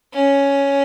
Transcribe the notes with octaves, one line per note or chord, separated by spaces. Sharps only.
C#4